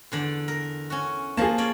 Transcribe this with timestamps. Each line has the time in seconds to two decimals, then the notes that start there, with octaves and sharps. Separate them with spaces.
0.12 E2 D3 D5
0.48 A#4
0.90 C#4 F#4
1.37 F3 A#3 G#4 A5
1.58 C#4 D5